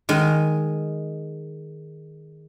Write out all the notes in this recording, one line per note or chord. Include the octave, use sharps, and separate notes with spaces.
D#3 G#3 G#5